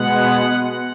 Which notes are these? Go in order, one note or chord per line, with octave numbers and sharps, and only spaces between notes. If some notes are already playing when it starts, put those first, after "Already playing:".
Already playing: B2 G#3 B3 F#5